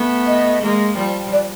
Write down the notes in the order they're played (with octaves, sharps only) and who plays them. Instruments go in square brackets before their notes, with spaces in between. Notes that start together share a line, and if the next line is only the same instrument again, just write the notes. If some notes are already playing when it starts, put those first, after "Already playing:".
Already playing: [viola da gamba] A3 B3
[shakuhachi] D#5
[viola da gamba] G#3 A#3
F3 G3
[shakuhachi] D5